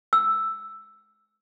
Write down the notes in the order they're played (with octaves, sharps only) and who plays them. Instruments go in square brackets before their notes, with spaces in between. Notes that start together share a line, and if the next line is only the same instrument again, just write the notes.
[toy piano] E6